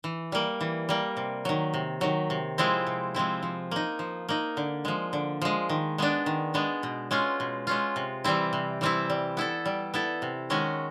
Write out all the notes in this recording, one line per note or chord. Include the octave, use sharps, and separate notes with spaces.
E3
G3 A#3
E3
G3 A#3
C3
D#3 F#3
C3
D#3 F#3
C3
F3 G#3 C4 E4
C3
F3 G#3 C4 E4
F3
A#3 D#4
F3
A#3 D#4
D3
F3 G#3
D3
F3 G#3
D#3
G#3 B3 D4
D#3
G#3 B3 D4
B2
G#3 C#4 F4
B2
G#3 C#4 F4
C3
E3 G3 C4 E4
C3
E3 G3 C4 E4
G3
B3 E4 A4
G3
B3 E4 A4
C3
D#3 G#3 C#4 F#4